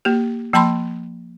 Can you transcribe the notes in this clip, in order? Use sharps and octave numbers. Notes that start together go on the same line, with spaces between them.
A#3 G4
F3 A#3 A5 B5 C6